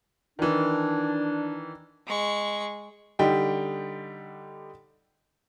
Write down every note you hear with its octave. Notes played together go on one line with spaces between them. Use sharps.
D#3 E3 D4
G#3 C#6
D3 G3 D#4 G5